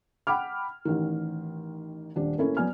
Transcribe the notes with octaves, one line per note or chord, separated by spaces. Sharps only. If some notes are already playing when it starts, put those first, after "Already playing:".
F#5 G5 B5 D6 F6
A1 D#3
D#1 D4
A2 A#3 C#4 E4 A4
F#3 B3 D5 G#5 F6